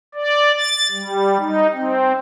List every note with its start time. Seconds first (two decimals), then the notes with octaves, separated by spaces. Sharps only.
0.15 D5
0.57 A6
0.91 G3
1.39 D#4
1.73 C4